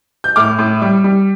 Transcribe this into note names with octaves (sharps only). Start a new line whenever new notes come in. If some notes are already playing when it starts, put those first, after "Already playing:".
G6
A2 D6 F6
A2
G3
G3